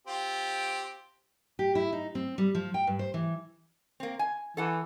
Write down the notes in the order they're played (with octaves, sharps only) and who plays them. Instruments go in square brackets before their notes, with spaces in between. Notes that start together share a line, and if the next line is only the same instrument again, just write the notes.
[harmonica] C4 F4 G4
[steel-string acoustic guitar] G4
E4
D#4
C4
G3
F3
G5
G2
C5
E3
[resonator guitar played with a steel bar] A#3 C4
G#5
[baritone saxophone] E3 [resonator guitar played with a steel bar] A4 F#5 A5